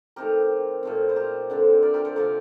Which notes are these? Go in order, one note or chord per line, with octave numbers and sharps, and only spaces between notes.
D#3 A3 C4 G4 A#4
A#2 A3 C4
C5
G4 A#4
D3 A3 C4
A#4 D5
G4 A#4
A4 C5
C3 F3 A3 A#4 D5